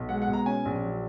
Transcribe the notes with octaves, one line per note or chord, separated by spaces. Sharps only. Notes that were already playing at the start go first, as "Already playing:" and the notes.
Already playing: B1
G#3 F#5
F#5
B2
A#5
C#4 G#5
A#1
F#3